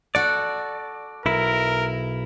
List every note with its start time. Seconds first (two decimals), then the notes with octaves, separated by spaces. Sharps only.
0.15 F#4 A4 D5
1.26 B1 E4 A#4